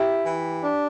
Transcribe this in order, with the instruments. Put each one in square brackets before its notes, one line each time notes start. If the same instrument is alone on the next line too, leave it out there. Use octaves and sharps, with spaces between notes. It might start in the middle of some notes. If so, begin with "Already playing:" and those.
Already playing: [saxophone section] E4 [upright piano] G4
[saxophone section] E3
D4